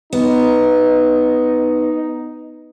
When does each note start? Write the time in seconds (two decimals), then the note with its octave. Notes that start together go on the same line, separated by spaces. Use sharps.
0.13 B3 D#4